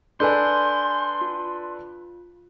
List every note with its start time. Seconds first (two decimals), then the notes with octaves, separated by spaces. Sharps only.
0.20 D4 A4 B4 G#5 C6 G6
1.21 F4